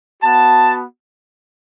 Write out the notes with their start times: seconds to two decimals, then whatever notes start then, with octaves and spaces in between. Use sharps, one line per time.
0.22 B3 F#4 A5